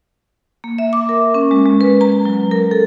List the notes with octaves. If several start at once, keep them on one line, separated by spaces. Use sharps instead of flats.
A#3
E5
D6
A#4
C#4
G#3
G#3
B4
A#5
F#3
A#4
A4